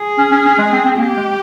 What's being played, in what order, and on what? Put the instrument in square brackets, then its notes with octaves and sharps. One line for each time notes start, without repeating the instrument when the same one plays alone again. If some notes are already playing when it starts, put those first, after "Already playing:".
Already playing: [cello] G#4
[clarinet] C#4
C#4
C#4
G#3
C4
C4
[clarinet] A#3 [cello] G4
[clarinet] G#3